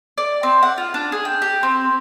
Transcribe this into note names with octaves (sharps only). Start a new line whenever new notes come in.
D5
C4
F#5
F4
D4
G#4
G5
G4
C4